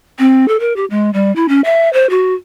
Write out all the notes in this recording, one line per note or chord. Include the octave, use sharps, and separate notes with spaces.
C4
A4
A#4
G4
G#3
G3
E4
C#4
E5
C5
F#4